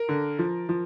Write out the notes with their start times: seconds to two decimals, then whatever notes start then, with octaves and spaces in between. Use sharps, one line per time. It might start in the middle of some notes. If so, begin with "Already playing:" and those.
Already playing: A#4
0.09 D3
0.39 F3
0.69 F3